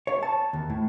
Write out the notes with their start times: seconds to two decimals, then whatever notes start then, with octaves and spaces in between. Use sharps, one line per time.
0.07 C#5
0.23 A5
0.53 D#2
0.70 A2